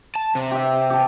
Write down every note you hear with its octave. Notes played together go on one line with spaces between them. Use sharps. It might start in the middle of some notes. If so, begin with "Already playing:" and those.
A5
C3
G4 E5
G4 G5 A5